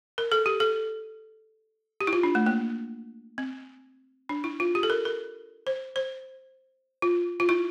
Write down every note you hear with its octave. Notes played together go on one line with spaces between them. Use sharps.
A#4
A4
G4
A4
G4
E4
F4
D4
A3
A#3
C4
D4
E4
F4
G4
A4
A#4
A#4
C5
C5
F4
F4
E4